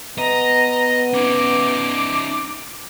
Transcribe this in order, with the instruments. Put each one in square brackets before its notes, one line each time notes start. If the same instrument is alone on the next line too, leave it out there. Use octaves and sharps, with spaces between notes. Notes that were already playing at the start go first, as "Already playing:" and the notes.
[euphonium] B3 [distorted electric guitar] D#5 [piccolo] A#5
[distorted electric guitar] C#4 D#4 [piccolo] D6